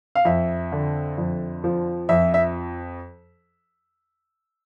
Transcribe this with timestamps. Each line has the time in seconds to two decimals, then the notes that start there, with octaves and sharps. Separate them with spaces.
0.15 F5
0.25 F2 E5
0.72 D3
1.18 F2
1.64 F3
2.09 F2 E5
2.34 E5